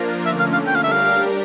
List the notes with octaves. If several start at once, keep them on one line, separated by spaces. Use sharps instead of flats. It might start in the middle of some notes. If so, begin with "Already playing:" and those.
Already playing: F3 A#3 D4 F4 A#4
D3 A3 C#4 E5
F5
F5
G5
F5
G3 D4 G4 A#4 E5
F5